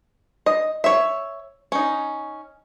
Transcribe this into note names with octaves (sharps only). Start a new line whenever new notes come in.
D#5
C#5 E5
C#4 D#4